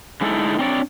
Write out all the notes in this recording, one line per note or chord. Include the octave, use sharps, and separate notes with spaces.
D3 G#3 A3 D#4 E4 A4
C4 D4 C#5 D5